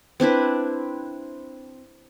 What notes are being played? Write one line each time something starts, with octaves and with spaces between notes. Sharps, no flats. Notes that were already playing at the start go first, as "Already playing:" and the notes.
C4 D4 E4 B4